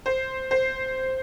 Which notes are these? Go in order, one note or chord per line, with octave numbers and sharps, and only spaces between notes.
C5
C5